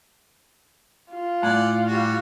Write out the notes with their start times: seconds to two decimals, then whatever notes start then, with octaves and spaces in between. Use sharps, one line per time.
1.11 F4
1.43 A2 A3 D5 F#5 G#5
1.86 G3 F#4